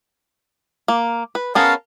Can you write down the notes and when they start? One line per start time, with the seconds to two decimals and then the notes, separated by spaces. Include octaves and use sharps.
0.88 A#3
1.35 B4
1.55 B3 C#4 G#4 A#4 F5 A5